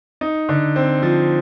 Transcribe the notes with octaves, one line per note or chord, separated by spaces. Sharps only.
D#4
D3
C4
F3